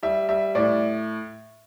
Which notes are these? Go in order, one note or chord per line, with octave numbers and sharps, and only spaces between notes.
G3 E5
G3 E5
A2 D5